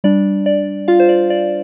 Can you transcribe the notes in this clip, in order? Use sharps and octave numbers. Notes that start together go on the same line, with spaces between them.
G3 D4 D5
D5
F4 F5
C5
D5
D5